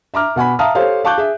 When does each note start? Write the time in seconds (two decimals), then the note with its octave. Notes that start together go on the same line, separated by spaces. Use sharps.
0.14 E5 A#5 D6 F6
0.36 B2 F#5 G#5 B5
0.59 E5 F5 A5 A#5 D#6 F6
0.75 G4 A4 C5 C#5 F5
1.04 F5 A5 C#6 D6 F#6 G6
1.18 G#4 E5